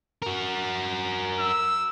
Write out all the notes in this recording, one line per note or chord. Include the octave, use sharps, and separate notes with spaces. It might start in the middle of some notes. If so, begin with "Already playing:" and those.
F#4 A#4
E6